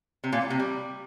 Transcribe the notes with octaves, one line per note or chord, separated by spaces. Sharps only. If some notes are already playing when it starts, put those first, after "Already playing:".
C3
A#2
A2
C3
G3